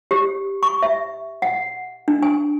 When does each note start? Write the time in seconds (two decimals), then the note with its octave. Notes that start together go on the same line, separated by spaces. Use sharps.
0.11 G4
0.63 C#6
0.83 E5
1.42 F#5
2.08 D4
2.23 G#5